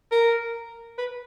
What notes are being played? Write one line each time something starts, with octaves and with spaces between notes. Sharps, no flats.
A#4
B4